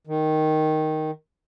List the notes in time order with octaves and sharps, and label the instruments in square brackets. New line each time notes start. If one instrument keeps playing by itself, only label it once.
[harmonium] D#3